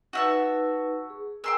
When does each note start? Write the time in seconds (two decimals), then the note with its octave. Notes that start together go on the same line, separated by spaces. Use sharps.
0.13 D#4 F#4 B4 E5 A5
1.10 G#4
1.44 A#4 G5 G#5 A#5 C6 E6